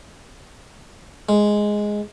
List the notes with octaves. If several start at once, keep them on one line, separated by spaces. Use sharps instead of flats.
G#3